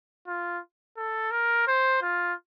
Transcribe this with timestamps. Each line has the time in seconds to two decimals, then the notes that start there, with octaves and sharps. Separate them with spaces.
0.27 F4
0.97 A4
1.31 A#4
1.67 C5
2.02 F4